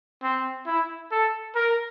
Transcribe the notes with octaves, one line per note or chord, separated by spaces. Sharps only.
C4
E4
A4
A#4